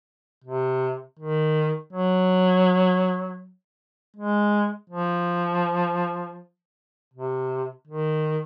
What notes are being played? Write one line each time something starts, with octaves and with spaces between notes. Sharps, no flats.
C3
D#3
F#3
G#3
F3
C3
D#3